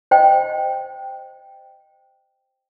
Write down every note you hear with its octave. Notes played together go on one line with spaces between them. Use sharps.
C5 D#5 G5